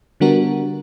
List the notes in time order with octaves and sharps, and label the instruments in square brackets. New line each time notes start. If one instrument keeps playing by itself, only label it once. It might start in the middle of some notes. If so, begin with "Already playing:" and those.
[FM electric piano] D3 G3 B3 D4 F#4 A#4